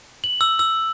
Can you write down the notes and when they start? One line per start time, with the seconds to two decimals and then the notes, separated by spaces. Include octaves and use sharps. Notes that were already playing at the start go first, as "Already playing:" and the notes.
0.24 F#7
0.41 E6
0.59 E6